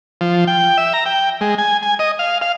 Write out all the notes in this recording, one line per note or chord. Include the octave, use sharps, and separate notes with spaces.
F3
G5
E5
A#5
G5
G#3
G#5
G#5
D#5
F5
F5